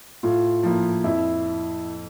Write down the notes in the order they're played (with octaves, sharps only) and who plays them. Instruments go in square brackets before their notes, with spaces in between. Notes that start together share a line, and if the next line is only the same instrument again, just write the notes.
[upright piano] A2 [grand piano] F4
[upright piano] F3 A#3 E4
[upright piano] F2 [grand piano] E4